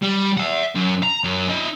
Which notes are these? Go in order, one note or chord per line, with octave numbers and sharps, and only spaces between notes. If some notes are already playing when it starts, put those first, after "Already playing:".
G3
E5 F#5
F#2
A#5
F#2
D#4 E5